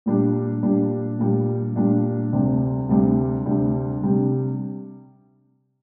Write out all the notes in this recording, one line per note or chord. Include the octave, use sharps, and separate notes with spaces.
A#2 G3 D4
A#2 G3 D4
A#2 G3 D4
A#2 G3 D4
D2 C3 G3 D4
D2 C3 G3 D4
D2 C3 G3 D4
C3 G3 D4